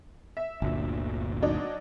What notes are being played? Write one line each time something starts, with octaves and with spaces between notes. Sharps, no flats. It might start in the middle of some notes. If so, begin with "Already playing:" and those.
E5
G1 D2 A#2
F#3 D4 D#4